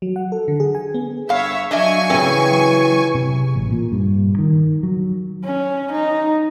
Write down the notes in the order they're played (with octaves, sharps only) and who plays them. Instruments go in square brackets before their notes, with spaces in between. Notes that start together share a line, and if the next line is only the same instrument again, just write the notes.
[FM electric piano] F#3
F#5
A4
D3
G#4
G#5
B3
[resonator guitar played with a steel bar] G2 F5 [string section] C#5 E5
[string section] F#3 G#5 C#6 [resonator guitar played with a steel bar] D4 D#5 E5
[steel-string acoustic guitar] C#3 E3 [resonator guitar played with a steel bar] C4
[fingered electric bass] C3
A1
A#2
G2
D#3
F#3
[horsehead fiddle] C#4
D#4